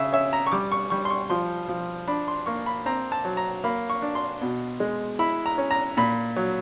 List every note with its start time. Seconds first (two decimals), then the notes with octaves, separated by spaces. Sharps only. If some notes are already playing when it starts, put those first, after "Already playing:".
Already playing: C#3 E5
0.12 C#4 E5
0.33 A#5
0.47 C#6
0.52 G3 D6
0.72 C#6
0.90 G3 C#6
1.05 C6
1.10 C#6
1.30 F3 C6
1.68 F3
2.08 D4 B5
2.28 C6
2.46 A#3 C#6
2.66 B5
2.86 C4 A#5
3.12 A5
3.25 F#3
3.37 A#5
3.64 A#3 B5
3.89 C#6
4.02 D4
4.15 C6
4.41 B2
4.80 G#3
5.19 E4 B5
5.46 A#5
5.58 C#4
5.71 A#5
5.97 A#2 B5
6.36 F#3